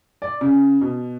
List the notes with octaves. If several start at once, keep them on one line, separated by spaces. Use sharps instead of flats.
D5
C#3
B2